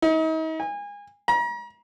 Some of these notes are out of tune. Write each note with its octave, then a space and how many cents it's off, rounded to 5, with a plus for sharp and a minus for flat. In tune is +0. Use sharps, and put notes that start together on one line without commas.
D#4 +40
G#5 -30
A#5 +40